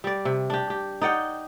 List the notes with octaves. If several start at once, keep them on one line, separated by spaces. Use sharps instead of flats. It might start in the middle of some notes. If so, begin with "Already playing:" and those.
G3 D5
C3
D4 G4
G4
D#4 D5 F#5 G5